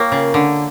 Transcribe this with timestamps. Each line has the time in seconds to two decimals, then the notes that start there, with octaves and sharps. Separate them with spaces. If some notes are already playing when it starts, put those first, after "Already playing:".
Already playing: A#3 F4 A#4 C#5 G5 C#6
0.12 C#3
0.34 D3